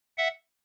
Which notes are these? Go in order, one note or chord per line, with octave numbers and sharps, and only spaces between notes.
E5 F#5